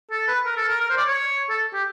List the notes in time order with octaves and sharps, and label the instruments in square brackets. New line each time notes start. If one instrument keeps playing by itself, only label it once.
[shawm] A4
B4
A#4
A4
A#4
A#4
C5
D5
C#5
A4
G4